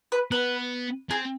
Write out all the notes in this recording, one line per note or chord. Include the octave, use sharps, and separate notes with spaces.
B4
B3 B4
C4 G#4